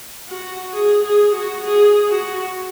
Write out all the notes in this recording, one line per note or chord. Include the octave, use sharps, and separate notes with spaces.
F#4
G#4
G#4
F#4
G#4
F#4